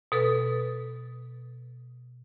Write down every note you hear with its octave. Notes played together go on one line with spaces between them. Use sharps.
B2 A4 B4